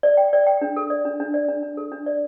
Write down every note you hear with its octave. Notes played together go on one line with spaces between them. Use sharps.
D5
G5
D5
G5
D4
A4
D5
D4
D4
D5
D4
D4
A4
D4
D5